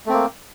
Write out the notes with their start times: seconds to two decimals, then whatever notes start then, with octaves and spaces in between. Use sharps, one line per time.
0.06 A3
0.10 C4
0.13 A#3